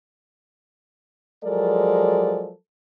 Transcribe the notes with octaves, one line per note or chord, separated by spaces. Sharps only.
F3 F#3 G#3 A4 A#4 D5